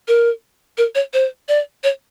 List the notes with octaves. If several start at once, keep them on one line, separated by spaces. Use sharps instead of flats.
A#4
A#4
C#5
C5
D5
C#5